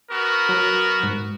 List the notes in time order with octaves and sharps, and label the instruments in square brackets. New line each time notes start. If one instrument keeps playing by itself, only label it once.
[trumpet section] B3 F#4 A#4
[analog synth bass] F#3
G#2